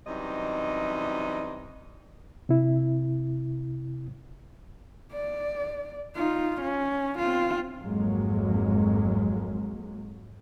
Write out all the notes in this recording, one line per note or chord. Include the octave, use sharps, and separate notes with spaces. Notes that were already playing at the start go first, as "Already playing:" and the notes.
F#2 C3 E3 G3 D#4 D#5
C3 E4
D5
D#4 F4
C#4
C4 F4
G#1 F2 G#2 F#3 G#3 A#3